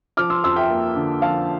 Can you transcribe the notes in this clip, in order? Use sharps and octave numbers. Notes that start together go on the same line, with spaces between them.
F3 D6 F6
C6 E6
F2 C6 E6
E5 G5
A#3
D3
F3 F5 A5